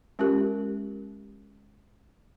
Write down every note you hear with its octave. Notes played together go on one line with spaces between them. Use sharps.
G#3 C#4 F4 G4 A#4